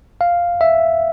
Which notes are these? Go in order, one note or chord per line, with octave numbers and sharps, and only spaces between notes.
F5
E5